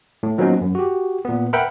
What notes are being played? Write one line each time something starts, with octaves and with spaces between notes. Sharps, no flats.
A2
F3 F#3 A#3 B3 C#4 D#4
F#2
F#4 G4
A#2 B3
A#4 B4 E5 F#5 G5 B5